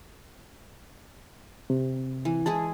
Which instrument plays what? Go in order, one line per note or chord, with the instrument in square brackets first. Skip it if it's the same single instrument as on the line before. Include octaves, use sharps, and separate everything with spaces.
[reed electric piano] C3
[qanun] E3
[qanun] G#3 E4 G#4 [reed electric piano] A5